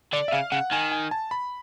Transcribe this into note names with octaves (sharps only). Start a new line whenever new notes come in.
D3 D5
E5
C#3 F5
C#3 F#5
D#3 G#5
G#5
A5
B5